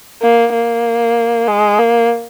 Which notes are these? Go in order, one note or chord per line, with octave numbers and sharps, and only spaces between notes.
A#3
A#3
G#3
A#3